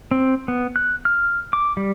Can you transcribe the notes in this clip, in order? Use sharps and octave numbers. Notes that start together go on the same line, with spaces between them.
C4
B3
F#6
F6
D6
G3